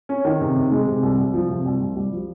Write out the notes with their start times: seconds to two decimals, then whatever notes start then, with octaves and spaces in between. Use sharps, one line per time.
0.09 C#4
0.25 D#3
0.41 C3
0.56 C3
0.72 G#3
0.87 C3
1.03 C2
1.18 C2
1.34 F3
1.50 C3
1.65 C2
1.81 C2
1.96 G3
2.12 F3